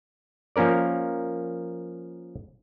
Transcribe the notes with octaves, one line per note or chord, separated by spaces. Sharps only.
F3 A#3 C#4 A#4 D5